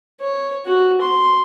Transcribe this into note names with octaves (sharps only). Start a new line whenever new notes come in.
C#5
F#4
C6